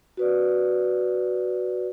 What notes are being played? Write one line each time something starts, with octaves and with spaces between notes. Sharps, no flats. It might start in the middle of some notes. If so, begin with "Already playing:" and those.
F#4 B4 D5